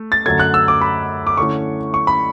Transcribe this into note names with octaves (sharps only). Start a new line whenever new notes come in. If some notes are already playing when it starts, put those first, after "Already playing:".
Already playing: A3
A6
F#2 D3 F#3 A3 G#6
F#6
E6
D6
B5
D6
D3 A3 C#4 E4 C#6
C#6
B5